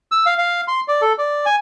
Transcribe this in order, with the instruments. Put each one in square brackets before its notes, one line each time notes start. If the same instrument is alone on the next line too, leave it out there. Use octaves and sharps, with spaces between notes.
[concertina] E6
F5
F5
C6
D5
A4
D5
G#5